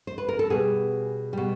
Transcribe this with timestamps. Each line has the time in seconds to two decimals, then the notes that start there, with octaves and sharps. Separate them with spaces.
0.07 C5
0.18 B4
0.29 A#4
0.39 A4
0.50 B2 G3 G#4
1.33 B2 G3